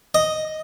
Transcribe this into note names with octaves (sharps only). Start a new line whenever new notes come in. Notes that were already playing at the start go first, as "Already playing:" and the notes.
D#5